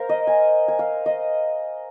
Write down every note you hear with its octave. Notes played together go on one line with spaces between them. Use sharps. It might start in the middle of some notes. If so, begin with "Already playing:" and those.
Already playing: A#4 C5 F5
D#5
G#5
G#5
F5
D#5